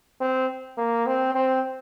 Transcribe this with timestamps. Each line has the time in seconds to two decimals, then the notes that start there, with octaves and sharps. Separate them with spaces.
0.21 C4
0.78 A#3
1.06 C4
1.35 C4